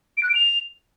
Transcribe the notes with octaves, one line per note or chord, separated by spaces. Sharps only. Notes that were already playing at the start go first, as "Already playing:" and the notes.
D7
F#6
D7
F7